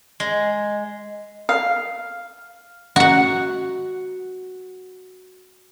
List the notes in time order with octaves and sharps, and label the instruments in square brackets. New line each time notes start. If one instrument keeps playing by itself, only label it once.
[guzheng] G#3
[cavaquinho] F5
[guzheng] F#4 F#5